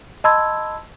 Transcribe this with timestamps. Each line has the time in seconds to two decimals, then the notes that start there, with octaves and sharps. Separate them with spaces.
0.24 D#5 A5 B5 C6 E6 G#6